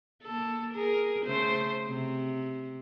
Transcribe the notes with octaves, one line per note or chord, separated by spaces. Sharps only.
A#3 A4
G#4 A#4
C#3 A3 C5
C3